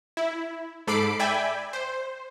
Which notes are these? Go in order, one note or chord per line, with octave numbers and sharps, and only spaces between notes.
E4
G#2 A4 B5 D6 C7 D7
D5 E5 G5 G#5 B5
C5